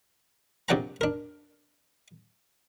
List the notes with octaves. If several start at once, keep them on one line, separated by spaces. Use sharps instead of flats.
A#1 C3 D5 F#5 G5 A#5
D4 A#4